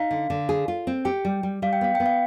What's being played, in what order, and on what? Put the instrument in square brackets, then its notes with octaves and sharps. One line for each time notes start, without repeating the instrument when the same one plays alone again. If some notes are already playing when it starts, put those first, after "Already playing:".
Already playing: [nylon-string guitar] D#4 [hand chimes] F5
[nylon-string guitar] D3
D3
G#4
F4
C4
[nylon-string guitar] G4 [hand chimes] G5
[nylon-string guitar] G3
G3
[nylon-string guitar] G3 [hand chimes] F5
[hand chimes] G5
[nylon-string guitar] B3 [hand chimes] F5
[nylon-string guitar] B3 [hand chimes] G5
[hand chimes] F5